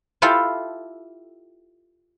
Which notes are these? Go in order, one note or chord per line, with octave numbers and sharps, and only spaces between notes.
E4 F4 G4 A4 F5